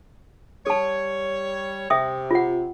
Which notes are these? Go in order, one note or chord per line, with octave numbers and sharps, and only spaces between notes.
G3 A4 C#5 A5
C3 E5 G5 D#6
F4 F#5